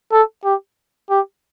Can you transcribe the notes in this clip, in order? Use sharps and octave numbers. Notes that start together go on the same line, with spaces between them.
A4
G4
G4